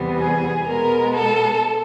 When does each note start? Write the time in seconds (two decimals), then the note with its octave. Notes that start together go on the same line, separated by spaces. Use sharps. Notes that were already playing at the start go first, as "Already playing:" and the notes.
Already playing: E2 C3 E3 G3 B3
0.20 G#4
0.68 B2 G#3 B3 A#4
1.15 A4